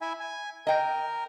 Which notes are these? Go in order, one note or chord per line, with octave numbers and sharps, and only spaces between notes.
E4 E5 G#5
G#5
A#4 D#5 G5